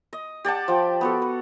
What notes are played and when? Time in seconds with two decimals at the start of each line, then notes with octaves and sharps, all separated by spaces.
0.13 D#5
0.44 G4 D5 F#5 A5
0.68 F3 G5
1.01 B3 F#4 A4
1.22 B4